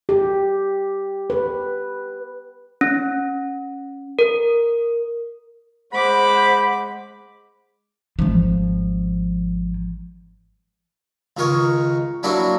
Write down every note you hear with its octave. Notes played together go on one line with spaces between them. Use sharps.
G4
B4
C#4
A#4
G#3 C5 F#5 B5 D6
G#1 F3
C#2 D#3 A#4 C#5
F#3 A#3 D4 E4 F#4